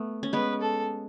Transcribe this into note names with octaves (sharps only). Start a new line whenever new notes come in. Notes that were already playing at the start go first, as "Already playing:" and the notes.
Already playing: A3 B3
C#4
G#3 B3 B4
A4